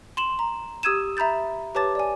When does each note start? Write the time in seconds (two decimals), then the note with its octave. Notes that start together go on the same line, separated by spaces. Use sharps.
0.17 C6 E7 F#7
0.39 A#5
0.83 G4 D#6 E6 G#6 D#7 E7
1.17 E5 A#5 B5 G6 A6
1.75 G4 B4 C#5 A5 D6 A6
1.95 D5 G#5